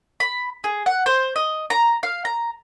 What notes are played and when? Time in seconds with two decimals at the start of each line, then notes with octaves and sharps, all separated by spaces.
0.20 B5
0.64 G#4
0.86 F#5
1.06 C5
1.36 D#5
1.70 A#5
2.03 F5
2.25 A#5